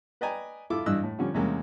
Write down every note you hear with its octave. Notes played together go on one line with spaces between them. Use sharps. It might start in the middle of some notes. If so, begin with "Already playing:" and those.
B4 D5 D#5 G5 G#5 A#5
E4 F4 A4 D6
G2 E3 D4 D#5 E6 F#6
A2
D3 F3 G3 C#4
E2 C3 G3 G#3 A#3 C#4